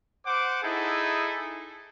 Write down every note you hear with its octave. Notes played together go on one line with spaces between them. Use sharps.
C5 F#5 D6
D#4 E4 G#4 A4